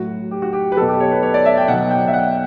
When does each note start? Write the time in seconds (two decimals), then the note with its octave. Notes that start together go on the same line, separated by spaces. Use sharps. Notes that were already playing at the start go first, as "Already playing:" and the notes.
Already playing: A2 F#3 F#4
0.31 G4
0.42 F#4
0.53 G4
0.72 B4
0.77 B2 F#3 A4
0.89 G4
1.00 C#5
1.11 B4
1.23 C#5
1.34 D5
1.46 E5
1.57 G5
1.68 B2 F#5
1.73 F#3
1.91 G5
2.07 E5
2.14 F#5